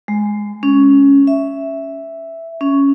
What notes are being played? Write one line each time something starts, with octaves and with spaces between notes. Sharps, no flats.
G#3
C#4
E5
C#4